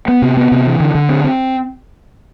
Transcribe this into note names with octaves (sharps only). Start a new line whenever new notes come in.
B3
C3
B3
C3
E3
D3
D3
C4
C4